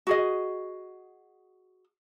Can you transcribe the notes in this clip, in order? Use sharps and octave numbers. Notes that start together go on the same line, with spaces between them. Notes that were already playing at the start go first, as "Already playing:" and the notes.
F#4 G#4 D#5